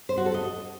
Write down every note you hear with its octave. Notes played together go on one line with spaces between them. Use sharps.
C5
F#4
A4
D#5